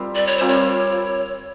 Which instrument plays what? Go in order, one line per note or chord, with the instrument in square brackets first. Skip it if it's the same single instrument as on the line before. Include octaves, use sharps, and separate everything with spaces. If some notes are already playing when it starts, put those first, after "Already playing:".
Already playing: [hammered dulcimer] G3 C4 F4 A#4
[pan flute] D5
C#5
[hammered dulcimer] G3 C4 F4 A#4 [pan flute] C5
[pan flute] C#5